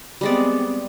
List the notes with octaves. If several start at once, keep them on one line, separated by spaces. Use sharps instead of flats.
G3 G#3 B3 C4 D5